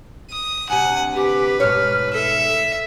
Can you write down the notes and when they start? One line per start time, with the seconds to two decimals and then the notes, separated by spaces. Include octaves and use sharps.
0.31 D#6
0.70 D2 C3 F#5 G#5
1.15 G4 B4
1.60 G#2 B2 C#5 F6
2.13 A4 E5